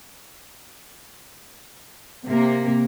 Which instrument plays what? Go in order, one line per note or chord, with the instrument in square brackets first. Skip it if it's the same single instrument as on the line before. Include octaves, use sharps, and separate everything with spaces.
[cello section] C3 A#3